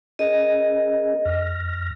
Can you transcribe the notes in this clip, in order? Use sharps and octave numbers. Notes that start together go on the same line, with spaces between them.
C#4 G#4 A#4 D#5
F2 F6 A#6